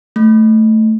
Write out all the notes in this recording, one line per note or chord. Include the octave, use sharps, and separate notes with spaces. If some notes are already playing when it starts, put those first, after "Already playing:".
A3